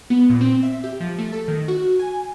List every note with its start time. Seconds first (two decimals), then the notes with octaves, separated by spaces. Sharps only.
0.10 B3
0.30 A#2
0.41 C4
0.63 E5
0.84 G4
1.00 F3
1.18 A3
1.32 A4
1.48 D#3
1.68 F#4
1.99 G#5